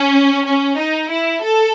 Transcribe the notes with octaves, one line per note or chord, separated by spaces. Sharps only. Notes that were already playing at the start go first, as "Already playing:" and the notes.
Already playing: C#4
C#4
D#4
E4
A4